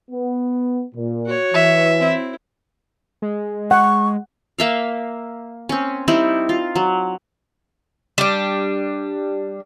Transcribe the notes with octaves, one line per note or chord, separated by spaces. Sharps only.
B3
A#2
F#4 C#5
E3 E5
C4 E4
G#3
F#5 C#6
A#3 E5 F5
C4 C#4
G3 C4 D#4 E4
F4
F#3
G3 D4